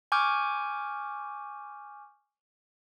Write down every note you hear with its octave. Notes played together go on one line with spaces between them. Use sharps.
G#5 C#6 D6 F6 G6